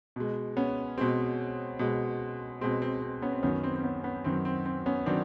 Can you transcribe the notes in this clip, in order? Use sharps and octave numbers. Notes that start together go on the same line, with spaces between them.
B2 G#3
B3 C#4
B2 G#3 C4
B2 G#3
B2 G#3 C4
C4
C4
B3 C#4
C4
F#2 D#3 F#3 B3 C#4
C4
C4
B3 C#4
B3 C#4
F#2 D#3 F#3 C4
C4
C4
B3 C#4
D#3 F#3 C4 D4